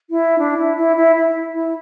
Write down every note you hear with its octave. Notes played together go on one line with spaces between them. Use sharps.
E4
D4
E4
E4
E4
E4
E4